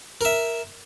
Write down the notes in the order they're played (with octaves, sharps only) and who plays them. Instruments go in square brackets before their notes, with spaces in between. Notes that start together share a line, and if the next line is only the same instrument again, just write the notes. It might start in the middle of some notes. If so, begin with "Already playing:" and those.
[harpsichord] A#4 E5